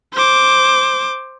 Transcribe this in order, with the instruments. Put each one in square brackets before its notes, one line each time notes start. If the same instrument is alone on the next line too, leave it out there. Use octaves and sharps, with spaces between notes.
[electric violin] C5 D6